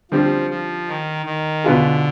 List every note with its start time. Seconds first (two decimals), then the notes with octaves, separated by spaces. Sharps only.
0.11 D3 F3 G3 C4 G4
0.50 F3
0.88 D#3
1.26 D#3
1.64 B2 D3 B3 F4 G#4